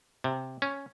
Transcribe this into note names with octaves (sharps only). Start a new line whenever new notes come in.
C3
C#4